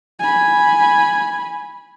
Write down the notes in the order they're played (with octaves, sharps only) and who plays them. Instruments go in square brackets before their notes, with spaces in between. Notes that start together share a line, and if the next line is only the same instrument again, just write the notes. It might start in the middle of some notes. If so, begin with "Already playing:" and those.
[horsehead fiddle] G#5 B5